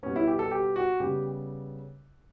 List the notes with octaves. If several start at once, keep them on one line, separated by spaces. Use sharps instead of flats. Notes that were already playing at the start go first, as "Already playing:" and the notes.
B2 G3 B3 C#4
E4
G4
A4
G4
F#4
C#3 G3 B3 G4